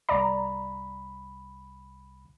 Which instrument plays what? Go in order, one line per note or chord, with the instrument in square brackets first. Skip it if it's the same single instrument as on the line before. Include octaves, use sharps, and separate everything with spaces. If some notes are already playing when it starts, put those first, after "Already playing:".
[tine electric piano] C2 B5 [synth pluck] D5 A#5